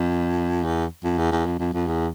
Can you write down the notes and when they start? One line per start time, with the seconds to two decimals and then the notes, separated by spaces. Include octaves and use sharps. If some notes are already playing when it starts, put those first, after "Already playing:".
Already playing: F2
0.64 E2
1.04 F2
1.18 E2
1.32 E2
1.46 F2
1.59 F2
1.73 F2
1.87 E2